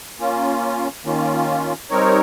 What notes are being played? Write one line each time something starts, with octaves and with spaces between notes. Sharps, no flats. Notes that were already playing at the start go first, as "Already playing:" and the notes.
A#3 C#4 F4
D#3 A#3 C#4 F4
G3 C4 D#4 A#4 C#5